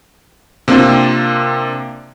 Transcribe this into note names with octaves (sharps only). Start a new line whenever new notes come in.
C3 A#3 C4 D4 F4